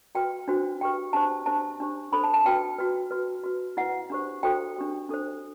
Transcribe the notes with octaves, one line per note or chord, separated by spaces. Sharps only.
F#4 B4 G5
D4 F#4 C5
D4 G4 B4 G5
D4 G4 C5 A5
D4 G4 C5 A5
D4 G4 C5
D4 A4 C5 B5
A5
A5
F#4 B4 G5
F#4 B4
F#4 B4
F#4 B4
E4 B4 F#5
D4 G4 C5
F#4 A4 C5 G5
D4 G4 C5
D4 A4 C5